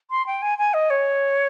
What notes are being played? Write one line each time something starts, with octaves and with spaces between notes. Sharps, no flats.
C6
G5
G#5
G#5
D#5
C#5